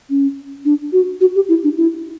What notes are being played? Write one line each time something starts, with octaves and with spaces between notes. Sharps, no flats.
C#4
D4
F#4
F#4
G4
E4
D4
E4